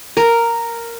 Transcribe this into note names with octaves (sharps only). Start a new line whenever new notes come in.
A#4